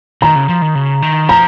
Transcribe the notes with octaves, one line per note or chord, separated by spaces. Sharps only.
D#3 A#5
C#3
F3
D#3
C#3
D#3
F3 A#5